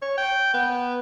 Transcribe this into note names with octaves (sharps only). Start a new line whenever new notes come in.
C#5
G5
B3